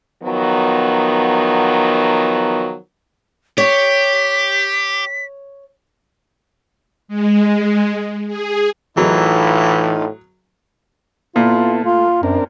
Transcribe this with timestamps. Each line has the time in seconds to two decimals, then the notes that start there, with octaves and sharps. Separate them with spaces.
0.24 D#3 F3 F#3 B3
3.58 G4 C#5 B6
7.08 G#3
8.27 G#4
8.97 A2 E3 F#3 D#4 F4 G#4 A#4
11.36 A#2 B3 E4 F4 A4
11.84 A3 F4
12.23 F#2 C4 D4 A#4